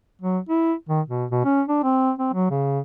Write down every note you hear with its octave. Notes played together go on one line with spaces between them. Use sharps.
F#3
E4
D#3
B2
B2
C#4
D4
C4
C4
F#3
C#3